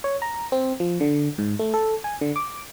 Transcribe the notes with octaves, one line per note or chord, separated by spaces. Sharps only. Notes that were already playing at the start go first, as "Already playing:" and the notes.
C#5
A#5
C4
F3
D3
G#2
A3
A4
G#5
D3
D6